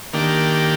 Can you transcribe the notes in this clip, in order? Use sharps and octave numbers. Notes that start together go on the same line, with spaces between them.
D#3 A#3 D4 G4